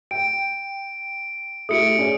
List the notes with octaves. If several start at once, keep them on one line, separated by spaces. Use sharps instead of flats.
G5 D7
A3 E4 G4 D#6 C#7 D7
C#4 G#4 D5